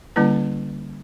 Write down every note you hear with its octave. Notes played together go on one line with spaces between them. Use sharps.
D3 G3 A#3 C#4 E4 B4